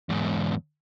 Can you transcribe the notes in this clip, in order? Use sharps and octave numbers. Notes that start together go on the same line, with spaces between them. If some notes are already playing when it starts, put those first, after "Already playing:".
E2 G#2